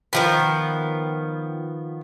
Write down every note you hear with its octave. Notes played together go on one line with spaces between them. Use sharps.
D#3 F3 B3